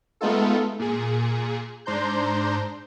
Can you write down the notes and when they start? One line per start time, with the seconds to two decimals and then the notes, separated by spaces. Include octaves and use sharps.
0.21 G#3 A3 B3 D#4 F4 A4
0.79 A#2 G#4
1.86 G#2 D4 C5 A#5 C6 G6